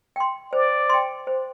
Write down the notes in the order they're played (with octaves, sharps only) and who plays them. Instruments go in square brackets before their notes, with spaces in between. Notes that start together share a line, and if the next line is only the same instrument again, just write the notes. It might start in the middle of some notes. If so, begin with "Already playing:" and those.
[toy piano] G5 C6
[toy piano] C5 [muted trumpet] D5
[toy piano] G5 C6
C5